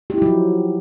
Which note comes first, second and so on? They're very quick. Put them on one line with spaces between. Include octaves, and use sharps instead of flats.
G4 E4 D#4 F#3 F3